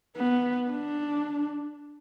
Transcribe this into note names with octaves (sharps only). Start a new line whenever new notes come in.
B3
D4